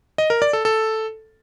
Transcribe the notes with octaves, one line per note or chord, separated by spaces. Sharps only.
D#5
A#4
D5
A4
A4